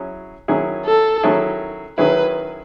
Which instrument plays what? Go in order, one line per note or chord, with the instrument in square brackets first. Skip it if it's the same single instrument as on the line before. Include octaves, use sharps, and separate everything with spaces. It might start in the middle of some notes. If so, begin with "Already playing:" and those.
Already playing: [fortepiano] F#3 C#4 E4 G#4
D#3 F#3 C#4 E4 G#4
[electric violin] A4
[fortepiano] D#3 F#3 C#4 E4 G#4
[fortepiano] D#3 F#3 C#4 E4 G#4 [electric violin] B4